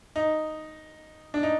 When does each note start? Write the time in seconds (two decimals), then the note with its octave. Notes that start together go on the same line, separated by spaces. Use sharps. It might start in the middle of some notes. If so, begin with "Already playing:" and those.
0.16 D#4
1.34 D4
1.43 D#4